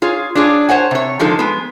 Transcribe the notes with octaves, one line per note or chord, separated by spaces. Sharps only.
F4 G#4 C#5
D4 F4 G#4 C#5
C5 C#5 F#5 G#5
C3 C#5
D3 F3 G#3 D#4 A4
G#3 B3